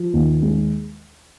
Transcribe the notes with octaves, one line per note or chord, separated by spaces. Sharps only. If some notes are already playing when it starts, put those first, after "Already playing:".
Already playing: F3
D#2
G#3